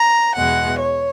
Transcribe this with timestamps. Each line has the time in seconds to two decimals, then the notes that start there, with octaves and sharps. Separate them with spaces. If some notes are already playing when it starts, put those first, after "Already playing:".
Already playing: A#5
0.36 E2 B2 G#3 F#5
0.80 C#5